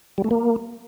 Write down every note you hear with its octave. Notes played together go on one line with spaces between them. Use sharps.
G3
A3
A#3